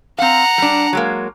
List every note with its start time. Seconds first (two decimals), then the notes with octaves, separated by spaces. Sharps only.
0.18 C4 F5 F#5 A#5
0.58 G3 D4
0.93 F#3 G#3 A#3